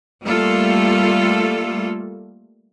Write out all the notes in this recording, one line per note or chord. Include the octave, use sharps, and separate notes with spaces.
G3 A3 A#3 F4 A4